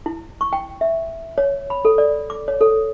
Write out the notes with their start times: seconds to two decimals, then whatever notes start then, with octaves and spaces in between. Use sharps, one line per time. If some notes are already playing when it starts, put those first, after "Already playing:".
0.06 E4
0.41 C#6
0.53 G5
0.81 E5
1.38 C#5
1.70 B5
1.85 A4
1.98 D5
2.30 D6
2.48 C#5
2.61 A4